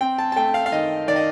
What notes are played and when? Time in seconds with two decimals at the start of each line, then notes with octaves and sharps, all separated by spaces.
0.01 C4 G5
0.18 A5
0.32 A5
0.36 A3 G5
0.54 F5
0.66 F5
0.72 D#3 D#5
1.08 D#3 D5
1.16 D#5